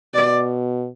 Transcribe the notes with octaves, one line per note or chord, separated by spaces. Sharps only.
B2 D5